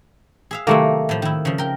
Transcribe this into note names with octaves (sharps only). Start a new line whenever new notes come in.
G#4 E5 F5
C3 D#3 F#3 A3 A#3 E4
A2 F3
D#3 E4
C#3 F3
A#4 G5